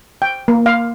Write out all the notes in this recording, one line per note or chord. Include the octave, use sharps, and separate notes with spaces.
G5
A#3
F5